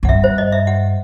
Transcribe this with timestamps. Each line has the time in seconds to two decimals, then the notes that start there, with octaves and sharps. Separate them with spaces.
0.03 F#2 F#5
0.09 G2 E5
0.24 C5
0.38 D#5
0.52 E5
0.67 F#5